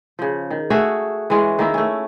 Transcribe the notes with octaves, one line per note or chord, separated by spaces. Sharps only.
C#3 F3
D#3
A3 F#4 G#4 E5
E3 G#3 C#4
D#3 A#3 E4
A3 C#4